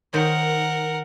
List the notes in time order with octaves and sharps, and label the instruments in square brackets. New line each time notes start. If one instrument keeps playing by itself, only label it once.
[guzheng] D#3 C5 C#5 [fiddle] A#4 F#5